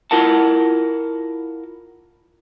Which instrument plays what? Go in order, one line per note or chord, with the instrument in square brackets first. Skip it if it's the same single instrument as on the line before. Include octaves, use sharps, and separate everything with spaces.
[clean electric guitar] E4 F4 A#4 F#5 A5